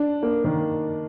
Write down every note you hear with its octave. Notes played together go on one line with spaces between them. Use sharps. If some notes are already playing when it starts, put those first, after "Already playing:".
Already playing: D4
A#3
D#3